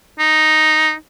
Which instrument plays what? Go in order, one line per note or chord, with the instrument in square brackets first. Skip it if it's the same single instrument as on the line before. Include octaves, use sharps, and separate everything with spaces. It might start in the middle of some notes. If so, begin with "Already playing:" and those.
[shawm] D#4